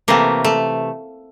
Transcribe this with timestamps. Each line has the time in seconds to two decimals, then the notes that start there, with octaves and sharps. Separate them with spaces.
0.08 C3 E3 A3 A#3
0.44 A3